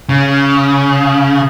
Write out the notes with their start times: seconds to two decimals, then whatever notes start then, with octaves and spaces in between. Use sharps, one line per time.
0.09 C#3